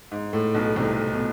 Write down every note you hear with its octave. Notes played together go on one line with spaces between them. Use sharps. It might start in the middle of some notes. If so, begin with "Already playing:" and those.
G#2
A2
B1 B2
C2 C3
B2